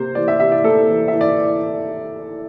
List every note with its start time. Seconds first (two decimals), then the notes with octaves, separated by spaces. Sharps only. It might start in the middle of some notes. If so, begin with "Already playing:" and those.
Already playing: C3 A#3 C5
0.15 E3 D5
0.28 E5
0.39 C3 E5
0.52 D5
0.64 A#3 A4
0.89 E3
1.08 E3 E5
1.21 D5